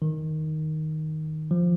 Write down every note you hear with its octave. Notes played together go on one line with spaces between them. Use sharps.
D#3
F3